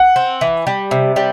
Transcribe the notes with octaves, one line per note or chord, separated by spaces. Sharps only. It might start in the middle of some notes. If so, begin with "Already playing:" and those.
Already playing: F#5
C4
E3
G3
C3
G3